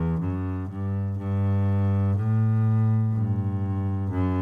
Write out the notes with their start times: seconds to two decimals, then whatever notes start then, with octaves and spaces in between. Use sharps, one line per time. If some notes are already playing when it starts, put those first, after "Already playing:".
Already playing: E2
0.20 F#2
0.69 G2
1.18 G2
2.16 A2
3.13 G2
4.11 F#2